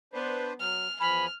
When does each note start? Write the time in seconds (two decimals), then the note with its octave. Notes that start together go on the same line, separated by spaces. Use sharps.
0.13 B3 D4 B4 C5
0.60 F#3 F6
1.00 E2 F3 G#5 B5 F6